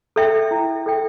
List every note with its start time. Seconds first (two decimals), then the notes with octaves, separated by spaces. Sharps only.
0.16 A4 E5 G5
0.51 E4
0.86 A4 E5 G5